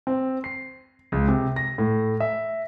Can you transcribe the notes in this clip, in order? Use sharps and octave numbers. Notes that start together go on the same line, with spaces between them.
C4
C7
C#2
C3
A#6
A2
E5